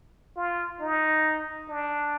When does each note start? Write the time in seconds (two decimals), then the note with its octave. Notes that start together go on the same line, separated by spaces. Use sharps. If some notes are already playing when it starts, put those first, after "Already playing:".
0.37 F4
0.80 D#4
1.69 D4